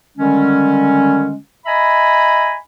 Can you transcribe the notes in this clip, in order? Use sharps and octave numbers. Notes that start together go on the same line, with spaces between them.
D3 D#3 G3 G#3 C#4
D#5 E5 G#5 A#5 B5